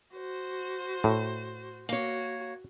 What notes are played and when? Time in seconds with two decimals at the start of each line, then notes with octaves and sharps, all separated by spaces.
0.15 F#4 C5
1.04 A2
1.89 A#3 F#4 C#5